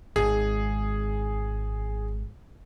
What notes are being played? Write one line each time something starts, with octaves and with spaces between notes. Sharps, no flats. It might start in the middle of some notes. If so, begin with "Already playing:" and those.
G#1 G#2 G#4